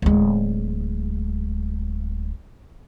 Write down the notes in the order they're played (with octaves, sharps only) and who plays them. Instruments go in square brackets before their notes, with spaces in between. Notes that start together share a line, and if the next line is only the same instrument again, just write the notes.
[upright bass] D1 G#3